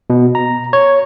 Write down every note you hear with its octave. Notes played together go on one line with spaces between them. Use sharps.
B2
A#5
C#5